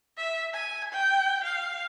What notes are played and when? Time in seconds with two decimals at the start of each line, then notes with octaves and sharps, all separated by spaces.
0.18 E5
0.54 G#5
0.93 G5
1.44 F5